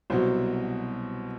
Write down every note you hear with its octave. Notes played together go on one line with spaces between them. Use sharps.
C2 B2 F#3 C5